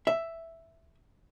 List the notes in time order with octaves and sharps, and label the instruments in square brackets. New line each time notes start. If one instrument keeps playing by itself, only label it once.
[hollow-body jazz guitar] E5